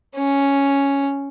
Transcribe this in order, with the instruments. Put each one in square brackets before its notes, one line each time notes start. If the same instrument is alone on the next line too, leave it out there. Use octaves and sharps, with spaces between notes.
[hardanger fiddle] C#4